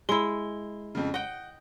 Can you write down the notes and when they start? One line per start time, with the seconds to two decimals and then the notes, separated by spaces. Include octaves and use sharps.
0.09 G#3 E4 G7
0.95 F2 C#3
1.14 D#5 F#5 G5